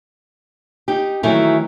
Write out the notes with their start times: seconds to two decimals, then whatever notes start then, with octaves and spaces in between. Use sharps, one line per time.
0.88 D#4 G4
1.23 D#3 E3 F#3 A3 D#4 E4